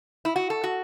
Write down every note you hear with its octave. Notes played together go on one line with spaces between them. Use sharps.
E4
F#4
A4
F#4